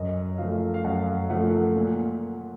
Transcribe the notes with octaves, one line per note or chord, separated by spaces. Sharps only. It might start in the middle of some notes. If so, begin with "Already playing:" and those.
Already playing: F#2 D#5
F3 A3 F5
F5
F#2 F#5
F3 A3 F#5
A#2